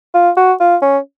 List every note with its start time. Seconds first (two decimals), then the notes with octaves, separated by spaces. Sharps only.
0.14 F4
0.37 F#4
0.60 F4
0.82 C#4